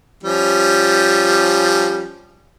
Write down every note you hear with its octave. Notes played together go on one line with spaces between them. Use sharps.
F3 G3 C#4